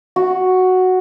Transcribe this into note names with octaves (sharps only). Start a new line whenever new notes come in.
F#4